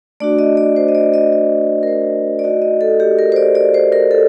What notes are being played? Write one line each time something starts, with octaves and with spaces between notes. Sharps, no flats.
A3 D4 F#4 D5
D#5
D5
C5
D#5
D5
D#5
D#5
A#4
C5
D5
A3 D#4 F#4 D#5
D#5
A4
G4
A#4
C5
D5
D5
C5
A#4
A4